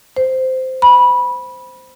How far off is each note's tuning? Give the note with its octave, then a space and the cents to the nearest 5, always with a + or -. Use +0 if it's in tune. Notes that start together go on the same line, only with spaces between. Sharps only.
C5 -10
B5 -15